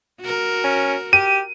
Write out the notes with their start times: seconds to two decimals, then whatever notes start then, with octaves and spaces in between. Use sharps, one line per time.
0.21 F#4 A#4
0.64 C#4
1.13 G4 D#7